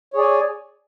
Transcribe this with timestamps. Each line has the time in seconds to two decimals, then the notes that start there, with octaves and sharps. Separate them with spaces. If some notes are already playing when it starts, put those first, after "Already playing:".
0.13 C#5
0.16 G#4
0.18 D5
0.21 G#5